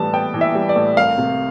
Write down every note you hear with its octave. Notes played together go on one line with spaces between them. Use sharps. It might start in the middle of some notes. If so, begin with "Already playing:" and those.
Already playing: A2 E3 G3 B3 A5
B3 G5
E3
E5
G3
D5
A2
C2 F5
C3